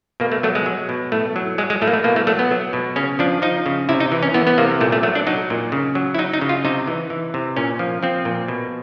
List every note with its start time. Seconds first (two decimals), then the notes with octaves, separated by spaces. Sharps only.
0.20 B2 A#3
0.32 A3
0.43 F#3 A3
0.55 G#3
0.66 F#3
0.89 B2
1.12 A2 A3
1.36 F#3
1.58 F#3 G#3
1.70 G#3
1.81 A2 A3
1.87 A#3
1.93 A3
2.04 B2 A#3
2.16 A3
2.27 F#3 A3
2.39 B3
2.51 F#3
2.73 B2
2.96 C#3 C#4
3.19 F3 D4
3.42 F3 D#4
3.66 C#3
3.89 C3 E4
4.00 D#4
4.12 E3
4.23 C#4
4.34 E3 B3
4.47 B3
4.58 C3 A#3
4.81 A#2 A3
4.92 A3
5.03 F#3 A3
5.15 D4
5.27 F#3 D#4
5.50 A#2
5.72 C#3
5.95 F#3
6.15 E4
6.18 F#3 D#4
6.33 D#4
6.42 C#3
6.49 F4
6.65 C3 D#4
6.87 E3
7.10 E3
7.34 C3
7.56 A#2 C#4
7.79 F3
8.03 F3 C4
8.25 A#2
8.48 B2